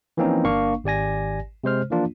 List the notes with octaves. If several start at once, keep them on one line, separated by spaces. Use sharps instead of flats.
E3 F3 A#3 C4 C#4 D#4
G1 A#3 D4 F5 C#6
G#1 G4 D5 G#5 A#6
C3 G#3 C5 F6
E3 F3 A#3 D4 F4